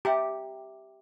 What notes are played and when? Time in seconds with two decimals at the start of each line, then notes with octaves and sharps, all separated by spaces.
0.05 G4 E5 G5 A#5